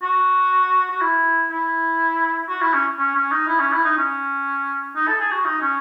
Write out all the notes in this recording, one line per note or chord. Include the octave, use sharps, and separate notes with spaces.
F#4
F#4
E4
E4
F#4
E4
C#4
C#4
C#4
D#4
E4
C#4
E4
D#4
C#4
D#4
A4
G#4
F#4
D#4
C#4